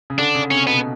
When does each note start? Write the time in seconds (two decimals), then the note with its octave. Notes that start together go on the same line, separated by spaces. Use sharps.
0.10 C#3
0.18 D3 D4
0.35 C#3
0.50 C3 C#4
0.67 B2 B3